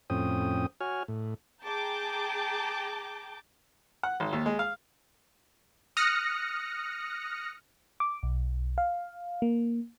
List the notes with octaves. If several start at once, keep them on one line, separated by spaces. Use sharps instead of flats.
F2 A2 C4 C#4 G5 D#6
F#4 C#5 G#5 F6
A2
G#4 G5 A5 A#5 D6 G6
F#5
G#1
D#2
G#3
F5
D#6 F6 F#6 A#6 C#7
D6
B1
F5
A#3